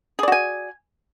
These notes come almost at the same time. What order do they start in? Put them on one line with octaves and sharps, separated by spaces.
G#4 D5 F#4 G#5